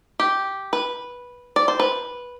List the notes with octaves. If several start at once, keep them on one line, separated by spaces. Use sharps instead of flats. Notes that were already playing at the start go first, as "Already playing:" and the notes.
G4
B4
D5
C5
B4